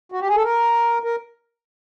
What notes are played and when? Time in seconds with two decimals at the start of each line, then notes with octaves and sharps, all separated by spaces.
0.12 F#4
0.20 G4
0.28 G#4
0.35 A4
0.44 A#4
1.04 A#4